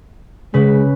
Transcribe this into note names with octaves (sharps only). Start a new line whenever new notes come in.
C#3 G#3 B4